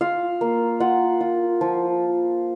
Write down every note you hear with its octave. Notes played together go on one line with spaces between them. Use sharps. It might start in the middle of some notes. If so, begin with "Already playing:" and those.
F4 F5
A#3
F4 F#5
F4
F3